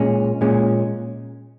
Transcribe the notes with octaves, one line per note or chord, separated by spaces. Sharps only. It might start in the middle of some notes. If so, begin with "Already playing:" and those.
Already playing: A#2 G#3 C#4
A#2 G#3 C#4